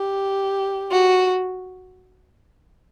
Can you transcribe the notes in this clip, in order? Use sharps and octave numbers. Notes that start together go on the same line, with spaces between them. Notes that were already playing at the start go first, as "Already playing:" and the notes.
Already playing: G4
F#4